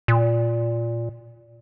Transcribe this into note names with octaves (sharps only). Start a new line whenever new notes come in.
A#2